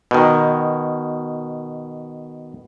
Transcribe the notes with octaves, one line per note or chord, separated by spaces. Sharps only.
B2 D#3